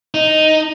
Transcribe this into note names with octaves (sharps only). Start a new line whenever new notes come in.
D#4